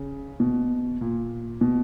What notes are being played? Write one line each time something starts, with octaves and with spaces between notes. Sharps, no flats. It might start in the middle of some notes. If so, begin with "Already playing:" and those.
Already playing: C#3
B2
A#2
B2